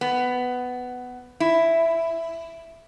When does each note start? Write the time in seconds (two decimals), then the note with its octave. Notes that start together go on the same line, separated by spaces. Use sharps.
0.01 B3
1.40 E4